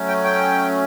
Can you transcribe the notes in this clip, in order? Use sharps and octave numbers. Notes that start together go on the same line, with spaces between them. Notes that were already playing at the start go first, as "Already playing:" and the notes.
Already playing: F#3 A3 C#4
G5
G5